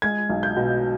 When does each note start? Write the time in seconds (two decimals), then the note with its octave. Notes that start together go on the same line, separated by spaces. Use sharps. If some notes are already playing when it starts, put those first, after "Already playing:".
0.02 G#3 G#6
0.29 B1
0.43 G6
0.57 B2